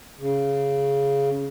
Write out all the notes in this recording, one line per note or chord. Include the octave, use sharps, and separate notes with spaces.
C#3